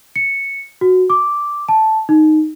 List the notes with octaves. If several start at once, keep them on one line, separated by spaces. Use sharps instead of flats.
C#7
F#4
D6
A5
D#4